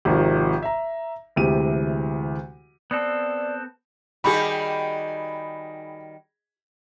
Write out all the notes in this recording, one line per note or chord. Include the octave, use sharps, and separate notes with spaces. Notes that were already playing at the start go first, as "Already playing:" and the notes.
G#1 C3 D#3 F3
E5 A#5
D2 C3 E3 G#3 G4 D#7
B3 C4 A4 D5
D#3 G3 F#4 G#4 B5